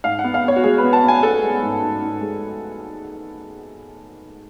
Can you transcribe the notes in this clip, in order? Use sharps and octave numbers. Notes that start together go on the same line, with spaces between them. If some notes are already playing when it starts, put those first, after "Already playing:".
G#2 F5
F#5
B3
F5
B3 C#5
F#4
G#3 G#4
B4
B3
A5
B3
G#5
B3 A4
G#3
G#2
G#2
G#2
G#3